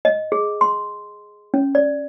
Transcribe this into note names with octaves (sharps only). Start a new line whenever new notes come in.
D#5
G#4
C6
C#4
D5